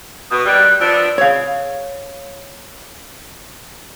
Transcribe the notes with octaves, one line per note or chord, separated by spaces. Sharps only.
B2 D#6
B2 D#3 G3 F#6
F3 B3 D4 E6
E6
C#5 F5